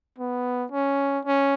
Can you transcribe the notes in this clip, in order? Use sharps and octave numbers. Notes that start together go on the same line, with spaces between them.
B3
C#4
C#4